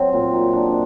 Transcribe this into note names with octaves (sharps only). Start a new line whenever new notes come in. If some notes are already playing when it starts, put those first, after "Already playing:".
Already playing: F#3 C4
A#2
D#4
D4